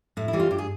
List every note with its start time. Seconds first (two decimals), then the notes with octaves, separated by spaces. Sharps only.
0.17 A2 E4
0.28 E4
0.33 E3 G3
0.40 F4
0.51 G2 G4
0.58 G#4